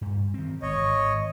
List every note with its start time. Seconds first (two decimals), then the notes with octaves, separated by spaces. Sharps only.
0.01 G2
0.34 D#3 C4
0.62 G#1 C#5 D#5